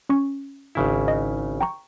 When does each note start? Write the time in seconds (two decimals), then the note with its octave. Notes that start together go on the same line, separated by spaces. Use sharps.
0.09 C#4 C#6
0.75 G#1 C#3 E4
1.08 D#5
1.61 G5 A#5 C#6